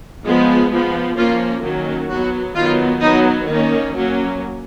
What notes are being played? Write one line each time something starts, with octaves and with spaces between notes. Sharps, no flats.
F3 G#3 B3
F3 B3
F3 A#3 C#4 F4
D#3 F#3 A#3 C#4
F#3 B3 F#4
D#3 F#3 B3 F4
F#3 B3 D#4
D#3 A#3 C#4
F#3 A#3 C#4